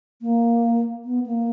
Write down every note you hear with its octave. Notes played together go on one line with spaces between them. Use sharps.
A#3
B3
A#3